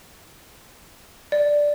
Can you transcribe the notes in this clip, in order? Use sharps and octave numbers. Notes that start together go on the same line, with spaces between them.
D5